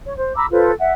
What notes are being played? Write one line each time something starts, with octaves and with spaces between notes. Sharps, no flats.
C#5
C5
A#5 B5 D6 E6
F4 A4 B4 C5
E5 F#5